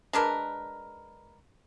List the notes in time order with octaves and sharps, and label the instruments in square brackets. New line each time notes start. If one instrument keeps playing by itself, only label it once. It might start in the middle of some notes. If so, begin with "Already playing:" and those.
[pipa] G#3 D4 A#4 B4